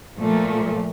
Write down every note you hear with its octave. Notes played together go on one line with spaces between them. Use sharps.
A#2 F3 A3